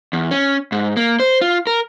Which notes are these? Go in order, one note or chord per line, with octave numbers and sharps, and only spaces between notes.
E2
C#4
G#2
A#3
C5
F4
A#4